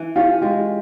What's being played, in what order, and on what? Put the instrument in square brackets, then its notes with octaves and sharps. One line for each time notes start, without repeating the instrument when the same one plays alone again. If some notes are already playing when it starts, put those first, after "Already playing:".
Already playing: [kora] E3
[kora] C#4 [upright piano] F4 G4
[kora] G#3 [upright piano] F4 G4